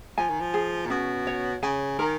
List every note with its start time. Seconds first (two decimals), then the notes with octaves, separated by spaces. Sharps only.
0.18 F3 G#5
0.29 D#3
0.40 F3
0.54 G#4
0.86 A#2
0.90 B2 C#4
1.27 C#5
1.63 C#3 G#5
1.99 D#3 A#4